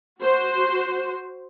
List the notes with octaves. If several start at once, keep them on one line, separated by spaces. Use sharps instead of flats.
F#4 C5